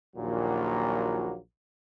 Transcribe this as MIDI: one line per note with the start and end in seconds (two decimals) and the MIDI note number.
0.16 1.36 34
0.16 1.36 39
0.16 1.36 46
0.16 1.36 54
0.16 1.36 58
0.16 1.36 66